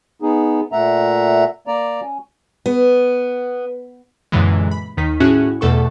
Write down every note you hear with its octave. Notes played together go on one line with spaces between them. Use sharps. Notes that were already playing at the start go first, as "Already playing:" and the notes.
B3 D#4 G#4
A#2 A3 E5 F#5 A#5
A#3 D5 A#5
C#4
B3
F#2 A#2 D3 E3 G#3
B5
D#2 D#3 D#4 B6
A2 C#4 E4 F#4 G#4 F#6
E2 B2 A3 A4 F#5 C#6